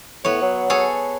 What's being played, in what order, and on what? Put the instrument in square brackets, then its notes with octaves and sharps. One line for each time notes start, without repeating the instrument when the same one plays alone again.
[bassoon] A2 [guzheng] B3 C#5
[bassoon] F#3
[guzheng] G#4 A4 C#5